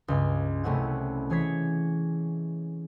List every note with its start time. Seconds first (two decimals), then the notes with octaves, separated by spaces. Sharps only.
0.08 C#2 G2 G#5
0.64 C2 A3 C#4 E4 F#5
1.30 E3 G#4 C#5 G#6 B6